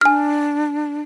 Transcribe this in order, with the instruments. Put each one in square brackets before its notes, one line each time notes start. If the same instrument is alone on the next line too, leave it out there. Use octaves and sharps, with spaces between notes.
[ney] D4 [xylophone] G#5 F6